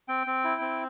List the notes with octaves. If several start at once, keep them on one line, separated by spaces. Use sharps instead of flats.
C4 G5
C4
E4
C4